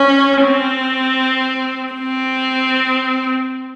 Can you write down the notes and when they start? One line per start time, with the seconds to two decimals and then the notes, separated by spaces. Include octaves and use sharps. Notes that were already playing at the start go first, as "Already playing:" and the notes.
Already playing: C#4
0.42 C4
1.94 C4